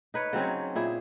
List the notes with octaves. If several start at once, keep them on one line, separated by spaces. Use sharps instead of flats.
D#4 B4 C#5
C#3 F#3 C4 C#4
A#2 E4 G#4